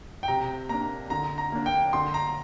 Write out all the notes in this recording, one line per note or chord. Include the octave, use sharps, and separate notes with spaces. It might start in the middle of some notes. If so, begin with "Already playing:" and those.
G5
C3 A#5
A#3 D4 A#5
D3 A#5
A#5
A#3 D4
G5
D3 C6
A#5